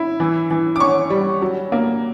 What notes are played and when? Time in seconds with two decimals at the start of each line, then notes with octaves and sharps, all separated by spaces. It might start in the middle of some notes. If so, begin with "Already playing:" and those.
Already playing: E4
0.20 E3
0.50 E3
0.76 D6
0.80 C#4 C#6
1.10 G3
1.42 F#3
1.72 A#3